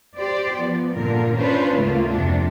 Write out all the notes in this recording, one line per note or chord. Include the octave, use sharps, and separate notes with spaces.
G4 C5 D5
F3 B3
G2 A#2 D3 A#4
C#4 D4 F4 B4 C5
D2 G#2 C#3 A3 A#3 F4
F2 C3 D4